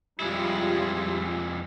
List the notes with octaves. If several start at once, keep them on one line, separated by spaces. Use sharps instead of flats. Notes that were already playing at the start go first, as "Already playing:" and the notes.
F2 G3 G#3 E4 F4